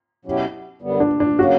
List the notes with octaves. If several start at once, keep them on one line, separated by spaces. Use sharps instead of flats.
B2 F#3 C#4 E4 G4
F#2 D3 G3 B3
D4
D4
C#3 F#3 A#3 C#4 F#4